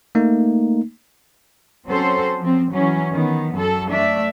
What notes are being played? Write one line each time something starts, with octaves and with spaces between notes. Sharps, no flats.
A3 A#3 D#4
F#3 C4 C#4 A4 C5
F3 C4
E3 F#3 C#4
D#3 B3
F#2 A4
A3 D4 D5 E5